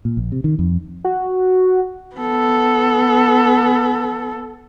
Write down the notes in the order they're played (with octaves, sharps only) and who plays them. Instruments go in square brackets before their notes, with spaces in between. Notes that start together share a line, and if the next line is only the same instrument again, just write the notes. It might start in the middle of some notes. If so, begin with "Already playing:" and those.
[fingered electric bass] A#2
A#1
C3
D#3
F2
[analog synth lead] F#4
[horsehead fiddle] B3 A4